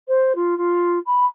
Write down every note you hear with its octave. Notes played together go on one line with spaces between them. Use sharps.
C5
F4
F4
B5